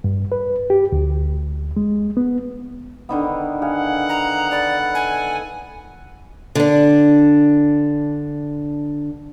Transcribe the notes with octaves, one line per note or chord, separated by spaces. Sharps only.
G2
B4
G4
D2
G#3
B3
D3 D#3 B3
G#4 F5 F#5
A#5
A4 B4 D5
G#5
D3 D4